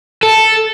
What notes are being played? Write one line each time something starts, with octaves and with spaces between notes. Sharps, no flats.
A4